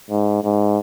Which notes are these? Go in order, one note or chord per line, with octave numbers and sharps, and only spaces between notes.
G#2
G#2